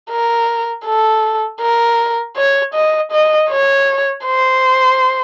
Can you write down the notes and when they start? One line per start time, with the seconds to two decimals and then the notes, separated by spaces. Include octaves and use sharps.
0.11 A#4
0.85 A4
1.61 A#4
2.37 C#5
2.74 D#5
3.11 D#5
3.50 C#5
4.25 C5